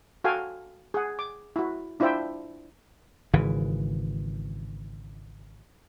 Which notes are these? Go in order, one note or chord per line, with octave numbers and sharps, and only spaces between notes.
F#4 A4 F5 G5 G#5
G#4 F#5
D6
E4 F#4
D4 E4 F4 C5 E5 G5
G#1 C#3 E3